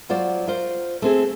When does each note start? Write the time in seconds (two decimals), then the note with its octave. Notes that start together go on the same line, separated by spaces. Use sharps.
0.09 F#3 F4 C5 D5
0.47 F4 A#4 C5
1.02 A3 C4 G#4